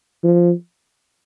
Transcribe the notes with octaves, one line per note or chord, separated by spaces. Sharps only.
F3